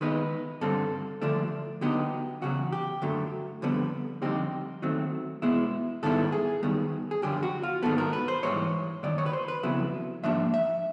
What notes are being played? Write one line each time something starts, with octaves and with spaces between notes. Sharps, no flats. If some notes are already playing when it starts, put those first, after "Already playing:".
D#3 G#3 B3 D#4 B4
G2 D3 G3 C4 A4
D3 F3 A3 D4
D3 F#3 B3 D#4 G4
E2 C#3 F#3 F#4
G4
F#2 D3 F#3 A3
F2 D3 G3 B3
F2 D3 G3 C4 D#4 G4
D#3 F#3 A3 C4
B2 G#3 B3 E4
G#2 D#3 G3 B3 E4 A4
G#4
F#2 D#3 G3 B3
G#4
F#2 D3 F3 G4
F#4
F4
G#2 D#3 F#3 B3 A4
A#4
B4
C5
G#2 E3 G3 C#5
F#2 D#3 F#3 D5
C#5
B4
C5
B4
F2 C#3 F#3 B3 E4
G#2 F3 A#3 D4 E5
E5